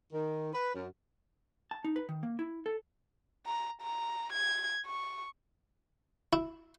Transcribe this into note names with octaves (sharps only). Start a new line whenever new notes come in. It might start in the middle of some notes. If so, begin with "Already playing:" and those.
D#3
B4
F#2
A5
D#4
B4
D#3
A#3
E4
A4
A#5
A#5
G#6
C#6
E4